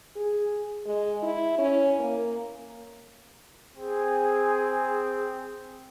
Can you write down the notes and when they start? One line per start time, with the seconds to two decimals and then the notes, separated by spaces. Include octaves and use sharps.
0.16 G#4
0.86 G#3
1.22 E4
1.58 C#4
1.99 A#3
3.77 C4 G#4